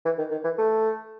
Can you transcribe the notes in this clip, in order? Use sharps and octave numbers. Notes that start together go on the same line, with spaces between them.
E3
D#3
D#3
E3
A3